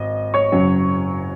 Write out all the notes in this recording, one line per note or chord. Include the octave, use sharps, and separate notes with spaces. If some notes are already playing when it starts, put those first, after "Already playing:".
Already playing: G#1 D#5
C#5 C#6
F#1 F#2 F#3